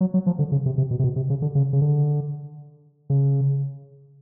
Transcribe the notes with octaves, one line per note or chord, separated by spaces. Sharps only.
F#3
F#3
F3
D3
C#3
C3
C3
B2
C3
B2
C3
C#3
D3
C#3
C#3
D3
C#3